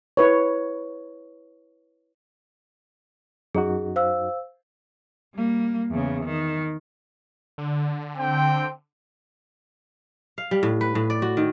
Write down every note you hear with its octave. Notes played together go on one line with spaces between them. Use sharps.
E4 B4 C#5
F#2 D#4 F#4 G#4
C5 F5 E6
G3 A#3
E2 C#3
D#3
D3
C4 G5
F5
G3
A2
B4
A2
D5
F#4
D#3